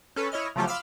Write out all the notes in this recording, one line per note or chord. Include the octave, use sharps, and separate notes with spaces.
C#4 A4 B4
E4 C#5 D#5 F6
C#3 F3 F#3 A3 F4 G4
F5 B5 C6 D6 E6 F6